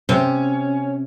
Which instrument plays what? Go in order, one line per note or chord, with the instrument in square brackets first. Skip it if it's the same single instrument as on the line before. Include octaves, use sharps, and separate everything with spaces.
[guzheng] C3 [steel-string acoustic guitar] C#4